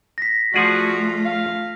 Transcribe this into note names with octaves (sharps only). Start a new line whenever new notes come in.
A#6 B6
F3 A3 F4 F#4 G#4 D5
F5